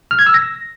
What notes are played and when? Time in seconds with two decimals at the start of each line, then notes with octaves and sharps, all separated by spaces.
0.11 F6
0.19 G#6
0.26 E6
0.34 A#6